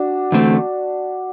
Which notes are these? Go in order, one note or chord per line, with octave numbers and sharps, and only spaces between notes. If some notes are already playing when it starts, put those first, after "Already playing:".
Already playing: D4 F#4
E2 D3 A3 C4